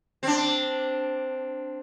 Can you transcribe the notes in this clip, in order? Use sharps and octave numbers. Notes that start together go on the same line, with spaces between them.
C4 D4